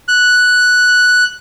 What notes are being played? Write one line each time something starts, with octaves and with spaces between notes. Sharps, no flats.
F#6